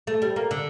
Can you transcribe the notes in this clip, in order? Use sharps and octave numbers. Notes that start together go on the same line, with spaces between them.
A3
G3
A#3
D3